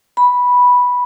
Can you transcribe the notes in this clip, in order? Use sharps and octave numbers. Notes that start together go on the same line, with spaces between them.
B5